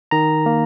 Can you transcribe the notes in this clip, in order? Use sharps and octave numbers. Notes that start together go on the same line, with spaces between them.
D#3 A#5
A#3